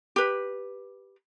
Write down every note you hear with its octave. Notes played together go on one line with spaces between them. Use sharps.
G4 B4